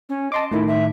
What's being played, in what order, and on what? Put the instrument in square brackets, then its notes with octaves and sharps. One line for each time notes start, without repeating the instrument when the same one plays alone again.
[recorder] C#4
[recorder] D#5 [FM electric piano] A5 C6 D6
[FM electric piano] A2 D#3 [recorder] E4
[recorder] E5